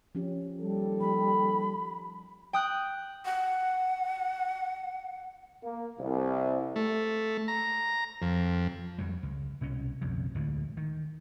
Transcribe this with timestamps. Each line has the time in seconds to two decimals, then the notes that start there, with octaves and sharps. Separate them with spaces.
0.15 F3 C#4 G4
0.60 D#2 G3 A4
1.01 F3 B5
2.53 G5 D#6 F#6
3.25 F#5
5.63 A#3
6.00 C2
6.76 A3
7.48 A#5
8.22 F2
8.98 F2 F#3 G3
9.23 C#2
9.61 C2 B2 C#4
10.01 B1 F2 C#3
10.35 D2 A2 D3 G#3
10.77 D#3